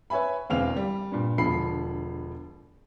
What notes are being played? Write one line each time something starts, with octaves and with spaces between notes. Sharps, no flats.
B4 C#5 E5 G#5 B5
E1 E2 C4 F5 F7
G3
G2 A#2
E1 D3 F3 B5 C7